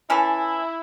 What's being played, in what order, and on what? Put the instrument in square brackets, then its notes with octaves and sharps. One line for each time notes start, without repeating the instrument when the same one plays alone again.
[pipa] E3 C#4 A4 [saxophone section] E4